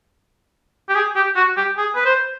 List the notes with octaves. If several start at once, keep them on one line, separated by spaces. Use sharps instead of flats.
G4
G#4
G4
F#4
G4
G#4
B4
C5